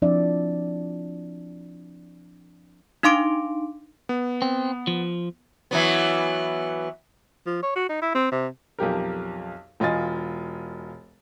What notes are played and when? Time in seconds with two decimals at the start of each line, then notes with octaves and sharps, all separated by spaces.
0.02 F3 C4 D4 E4 D5 E5
3.03 D4 D#4 F5 C6 D6 D7
4.09 B3
4.42 C4
4.87 F3
5.71 E3 F#3 B3
7.46 F3
7.63 C#5
7.76 F#4
7.89 D#4
8.02 E4
8.15 C4
8.32 C3
8.79 B1 F2 G4 A#4
9.80 E1 F4 D#5 G#5 A6